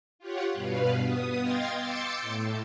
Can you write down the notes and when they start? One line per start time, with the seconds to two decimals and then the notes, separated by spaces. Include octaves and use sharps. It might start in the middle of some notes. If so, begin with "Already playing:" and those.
0.19 F4 G4 C#5 F#5
0.53 G2 B2 B4 F5
0.97 B3 D#6
1.38 D#5 F5 G5 C6 G#6 A6
1.76 C6 D6 E6 G6 A6 C#7
2.21 A2